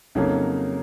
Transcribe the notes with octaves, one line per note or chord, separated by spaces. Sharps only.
F2 C#3 F#3 A#3 D#4